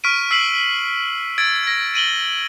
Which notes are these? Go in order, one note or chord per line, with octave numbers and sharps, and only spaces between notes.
C#6 F6 B6 D7 D#7
E6 B6 C7 F#7
E6 G#6 A6 D7
G#6 A#6
D7 D#7 F#7 G7